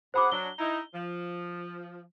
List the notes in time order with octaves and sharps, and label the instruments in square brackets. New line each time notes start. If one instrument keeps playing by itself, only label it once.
[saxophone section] F#2 G#4 F#5 [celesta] C5 B5 D6
[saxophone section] F#3 D4 [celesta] G7
[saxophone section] D#4 E4
F3